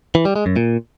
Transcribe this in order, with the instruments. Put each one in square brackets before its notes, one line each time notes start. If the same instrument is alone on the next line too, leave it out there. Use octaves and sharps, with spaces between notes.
[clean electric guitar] E3
G3
G#3
F#2
A#2